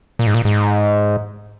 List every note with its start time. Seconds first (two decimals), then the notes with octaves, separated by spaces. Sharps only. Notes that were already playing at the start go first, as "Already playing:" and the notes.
0.19 A#2
0.27 G#2
0.35 A#2
0.45 G#2